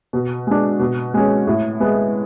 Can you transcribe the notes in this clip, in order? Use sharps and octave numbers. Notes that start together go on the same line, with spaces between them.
B2
G#3 D4
B2
G#3 C#4
A2
G#3 B3